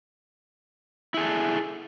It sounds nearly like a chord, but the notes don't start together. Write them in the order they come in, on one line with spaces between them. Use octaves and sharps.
E4 G#4 A4